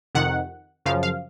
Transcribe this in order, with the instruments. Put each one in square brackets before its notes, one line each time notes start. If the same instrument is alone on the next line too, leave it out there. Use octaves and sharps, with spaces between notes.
[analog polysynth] F2 C3 D#3 F#5
F#2 C#3 F3 F5
F5